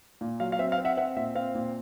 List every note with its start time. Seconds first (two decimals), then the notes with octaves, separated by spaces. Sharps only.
0.21 A#2
0.40 F#3 F5
0.52 F5
0.59 C4 E5
0.72 F5
0.78 C4
0.85 E5 F#5
0.97 C4 E5 F#5
1.16 A#2 E5
1.35 C4 F5
1.55 A#2